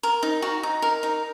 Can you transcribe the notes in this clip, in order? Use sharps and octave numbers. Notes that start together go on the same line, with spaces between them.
A#4
D#4
F#4
D#4
A#4
D#4